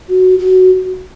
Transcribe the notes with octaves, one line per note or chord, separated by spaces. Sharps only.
F#4
F#4